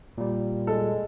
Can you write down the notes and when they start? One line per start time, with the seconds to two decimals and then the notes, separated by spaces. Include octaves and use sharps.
0.18 A#2 G3
0.67 G#3 A4